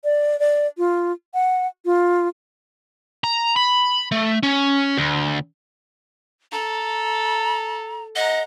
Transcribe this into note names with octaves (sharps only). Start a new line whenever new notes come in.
D5
D5
F4
F#5
F4
A#5
B5
A3
C#4
D2
A4 A#5
D#5 F#5 A#5